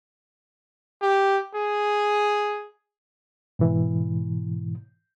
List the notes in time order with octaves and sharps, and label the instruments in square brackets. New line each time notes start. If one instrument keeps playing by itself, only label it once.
[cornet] G4
G#4
[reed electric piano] G#2 B2 E3